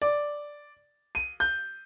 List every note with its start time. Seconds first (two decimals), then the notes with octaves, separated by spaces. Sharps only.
0.02 D5
1.15 D#7
1.40 G6